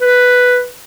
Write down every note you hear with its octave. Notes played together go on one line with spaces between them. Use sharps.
B4